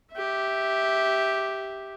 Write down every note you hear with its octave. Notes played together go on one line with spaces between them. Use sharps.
G4 E5